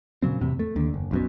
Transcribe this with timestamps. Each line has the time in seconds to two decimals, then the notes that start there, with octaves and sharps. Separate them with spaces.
0.22 A#2 C#3 F#3 C4
0.41 E2 A2 C3
0.59 A3
0.76 D#2 D3
0.94 F#1
1.11 B1 F#2 B2